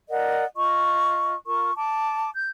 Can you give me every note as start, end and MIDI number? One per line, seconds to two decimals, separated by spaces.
0.09 0.44 70
0.09 0.44 74
0.09 0.44 75
0.09 0.44 78
0.55 1.35 65
0.55 1.35 75
0.55 1.35 85
1.46 1.72 65
1.46 1.72 70
1.46 1.72 85
1.76 2.30 81
1.76 2.30 86
2.34 2.49 91